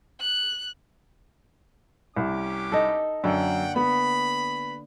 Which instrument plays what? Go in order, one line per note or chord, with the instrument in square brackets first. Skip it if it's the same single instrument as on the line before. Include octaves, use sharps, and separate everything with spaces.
[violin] F#6
[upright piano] C2 [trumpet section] C#4 G4 D6
[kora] D#4 A4
[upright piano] F#2 [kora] D3 A#3 [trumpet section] F#5 G5
[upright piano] B3 [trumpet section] B5